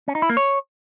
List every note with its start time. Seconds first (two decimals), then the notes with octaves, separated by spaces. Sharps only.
0.08 C#4
0.15 D#4
0.22 E4
0.30 A#3
0.37 C#5